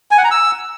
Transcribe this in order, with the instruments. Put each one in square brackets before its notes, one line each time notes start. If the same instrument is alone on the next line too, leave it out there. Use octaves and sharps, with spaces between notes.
[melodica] G#5
F#5
A#5
E6